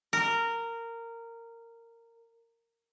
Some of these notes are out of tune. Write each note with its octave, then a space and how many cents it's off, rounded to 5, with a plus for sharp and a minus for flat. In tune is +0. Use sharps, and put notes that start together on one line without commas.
A#4 -15